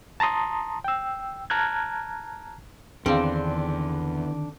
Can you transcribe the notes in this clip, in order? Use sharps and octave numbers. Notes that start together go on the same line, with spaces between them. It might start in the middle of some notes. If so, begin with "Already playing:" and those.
A5 A#5 C6 D#6
G5 E6
A5 A#5 F6 F#6 G#6
E2 D3 D#3 C4 D4 G#4 F5